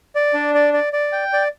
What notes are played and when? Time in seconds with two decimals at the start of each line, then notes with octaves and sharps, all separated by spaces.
0.15 D5
0.34 D4
0.55 D5
0.73 D5
0.93 D5
1.12 G5
1.33 D5